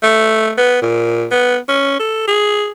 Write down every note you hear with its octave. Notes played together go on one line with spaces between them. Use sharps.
A3
B3
A#2
B3
C#4
A4
G#4